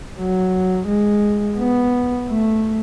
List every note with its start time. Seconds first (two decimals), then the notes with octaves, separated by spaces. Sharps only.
0.19 F#3
0.87 G#3
1.58 B3
2.30 A3